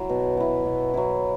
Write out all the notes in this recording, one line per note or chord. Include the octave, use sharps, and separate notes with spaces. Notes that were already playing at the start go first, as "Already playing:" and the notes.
Already playing: F#3 E4
B2
F#3 E4
B2
F#3 E4